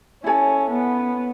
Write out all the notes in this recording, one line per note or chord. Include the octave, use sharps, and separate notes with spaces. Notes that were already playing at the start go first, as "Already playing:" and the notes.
C#4 E4 A4 C#5 G#5
B3